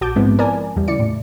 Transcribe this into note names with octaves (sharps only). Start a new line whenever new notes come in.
A#1 F#4 A5 D6 G6
G#2 F3 G#3 B3 C4 E4
A#4 B4 D5 G#5 A5
E2 G3
C#3 E4 D5 C#7
A2